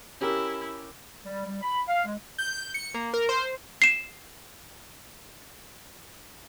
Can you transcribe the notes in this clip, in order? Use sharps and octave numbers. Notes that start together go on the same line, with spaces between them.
C#4 E4 G4 A#4
G3
G3
B5
F5
G#3
G6
C#7
A#3
A#4
C5
C7 E7